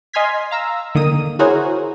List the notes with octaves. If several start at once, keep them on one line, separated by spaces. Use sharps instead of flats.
D#5 G#5 C6 F6 G#6 B6
F5 A#5 E6
D3 D#3 A#3 D#6 D#7
E4 F#4 G#4 A#4 C5 C#5